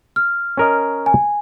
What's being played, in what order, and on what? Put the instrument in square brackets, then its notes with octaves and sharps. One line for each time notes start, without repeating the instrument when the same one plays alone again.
[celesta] F6
[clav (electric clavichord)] C#4 A#4 D#5
[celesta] G#5